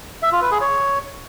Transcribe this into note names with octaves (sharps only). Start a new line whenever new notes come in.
E5
F4
B4
G#4
C#5